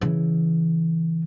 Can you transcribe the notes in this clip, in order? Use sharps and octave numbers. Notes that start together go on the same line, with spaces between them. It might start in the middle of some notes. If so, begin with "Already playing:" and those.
C#3 E3